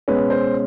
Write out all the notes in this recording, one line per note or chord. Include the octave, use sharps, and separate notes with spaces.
B2 G#3 C#4 B4
C5